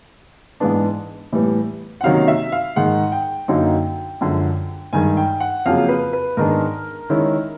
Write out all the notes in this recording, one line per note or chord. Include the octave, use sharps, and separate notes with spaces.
G#2 E3 G#3 B3 D4
A2 E3 G3 B3
F#5
C3 D#3 F#3 A#3 C#4 F5
E5
F5
G#2 D#3 G#3 F#5
G5
F#2 D3 F#3 A#3 D#4
F#2 D3 F3 G#3
G2 D#3 G#3 G#5
G5
F#5
F2 C#3 F#3 A#3 F5
B4
B4
G#2 D#3 G#3 B3 D4 A#4
D#3 G#3 C#4 E4